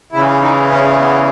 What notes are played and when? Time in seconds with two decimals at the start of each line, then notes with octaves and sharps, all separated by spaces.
0.12 E2 C#3 E3 E4
0.41 D#4
0.71 C#4
1.00 B3